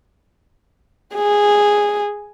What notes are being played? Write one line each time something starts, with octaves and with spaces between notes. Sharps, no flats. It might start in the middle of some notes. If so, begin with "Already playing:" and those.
G#4